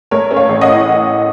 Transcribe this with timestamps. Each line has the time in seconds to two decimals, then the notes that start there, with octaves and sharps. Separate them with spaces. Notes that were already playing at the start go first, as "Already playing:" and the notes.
0.11 A3 A#4 C#5
0.31 C#4
0.36 C#5 F5
0.49 A1
0.61 D#5 F#5
0.68 A2